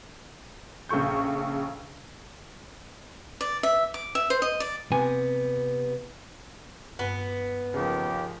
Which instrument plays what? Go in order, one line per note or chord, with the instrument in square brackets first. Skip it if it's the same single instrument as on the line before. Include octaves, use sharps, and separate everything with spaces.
[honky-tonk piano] A#1 C#3 A4 C#6 G6
[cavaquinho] D5
E5
D6
E5
C5
D#5
D5
[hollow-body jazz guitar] C3 B3 G#5
[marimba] G2 [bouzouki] B3
[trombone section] D#2 A#3 G4 [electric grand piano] C#3 F3